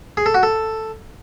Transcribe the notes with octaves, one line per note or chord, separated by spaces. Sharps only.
G#4
A4
F#4
A4